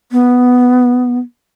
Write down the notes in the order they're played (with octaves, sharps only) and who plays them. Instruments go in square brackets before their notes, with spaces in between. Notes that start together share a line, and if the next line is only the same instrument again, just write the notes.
[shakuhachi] B3